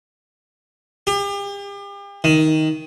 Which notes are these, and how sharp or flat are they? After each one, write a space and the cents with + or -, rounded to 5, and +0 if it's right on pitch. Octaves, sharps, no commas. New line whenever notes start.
G4 +40
D#3 +10